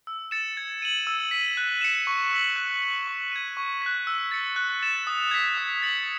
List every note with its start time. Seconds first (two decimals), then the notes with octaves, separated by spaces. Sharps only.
0.07 E6
0.31 A6 C#7 E7
0.57 G#6
0.82 D#7 F#7
1.07 E6
1.31 B6 D#7
1.57 F#6
1.81 C#7 E7
2.07 C#6
2.32 E6 B6 F#7
2.56 F#6
2.81 C#7 F#7
3.07 C#6
3.32 G#6 D#7
3.57 C#6
3.82 F#6 B6
4.07 E6
4.31 A6 C#7
4.56 F#6
4.82 A6 E7
5.07 D#6
5.31 G#6 B6
5.57 D#6
5.82 A6 C#7 F#7